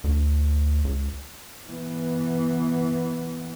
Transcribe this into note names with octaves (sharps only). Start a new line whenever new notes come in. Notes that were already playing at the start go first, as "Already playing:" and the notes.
D2
C#2
E3 B3